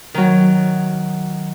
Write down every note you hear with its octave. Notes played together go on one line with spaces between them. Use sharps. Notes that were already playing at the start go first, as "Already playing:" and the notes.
D#3 F#3